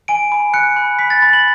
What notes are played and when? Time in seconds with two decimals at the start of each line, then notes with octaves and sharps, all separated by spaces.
0.08 G#5 D7
0.32 B5
0.54 F#6 C#7
0.76 B5
0.99 B5 B6
1.10 A6
1.22 B5 A6
1.33 F#7